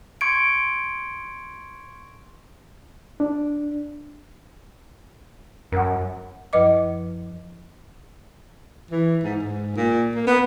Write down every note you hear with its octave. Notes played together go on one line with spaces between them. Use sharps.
C6 C#6 G#6 C#7 D7
D4
F#2 A#4 F#5
F#2 F3 B4 D#5 D6
E3
G#2
G#2
A#2
A#3
B3